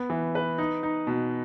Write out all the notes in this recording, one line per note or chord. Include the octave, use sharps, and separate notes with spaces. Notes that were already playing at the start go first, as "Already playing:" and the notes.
Already playing: B3
E3
B4
D#4
D#4
B2